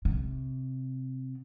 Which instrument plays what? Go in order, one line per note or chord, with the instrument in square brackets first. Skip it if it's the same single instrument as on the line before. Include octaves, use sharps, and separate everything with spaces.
[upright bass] C3